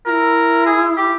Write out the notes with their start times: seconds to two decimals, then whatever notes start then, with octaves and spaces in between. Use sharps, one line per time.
0.06 F4 A#4
0.09 E4
0.66 G#4
0.97 G4